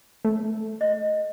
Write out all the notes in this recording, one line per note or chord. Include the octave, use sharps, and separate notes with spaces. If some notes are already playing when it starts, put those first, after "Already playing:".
A3
D#5